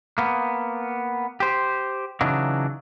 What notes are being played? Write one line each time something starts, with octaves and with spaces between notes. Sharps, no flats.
A#3 B3
G4 C5
C#3 E3 F#3 D4 D#4